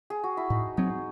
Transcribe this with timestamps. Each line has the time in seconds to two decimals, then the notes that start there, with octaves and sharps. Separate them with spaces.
0.10 G#4
0.24 F#4
0.37 E4
0.50 A2 D#4
0.77 F#3 C4 D#4